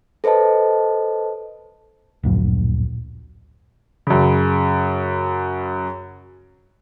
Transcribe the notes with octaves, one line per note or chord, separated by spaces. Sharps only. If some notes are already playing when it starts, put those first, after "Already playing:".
A4 B4 C5 D#5 A5
D1 A#1 F#2
F#2 C#3